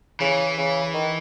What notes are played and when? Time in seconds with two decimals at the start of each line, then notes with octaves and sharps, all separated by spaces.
0.20 C#3 E3
0.57 C#3
0.94 D#3